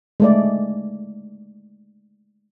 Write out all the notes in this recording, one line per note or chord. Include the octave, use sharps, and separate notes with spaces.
G#3 A3 D5